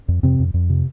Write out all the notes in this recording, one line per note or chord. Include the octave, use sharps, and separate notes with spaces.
F2
F2 C3 C4
F2
F2
C3